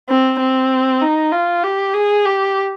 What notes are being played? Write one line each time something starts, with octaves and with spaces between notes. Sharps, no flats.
C4
C4
D#4
F4
G4
G#4
G4